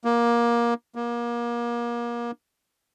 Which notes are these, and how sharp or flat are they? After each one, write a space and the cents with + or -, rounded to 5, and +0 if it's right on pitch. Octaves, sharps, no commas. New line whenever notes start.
A#3 +20
A#3 +30